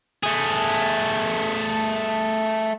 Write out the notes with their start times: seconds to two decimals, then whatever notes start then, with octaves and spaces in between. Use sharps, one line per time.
0.23 A3 G#4